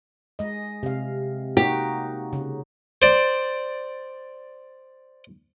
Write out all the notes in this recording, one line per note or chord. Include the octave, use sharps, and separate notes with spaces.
G#3 D#5
C3 F5
A#3 D#4 F#4 G4
C#3
C5 D5